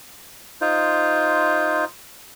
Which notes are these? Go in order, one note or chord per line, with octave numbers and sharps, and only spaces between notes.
D#4 F4 C5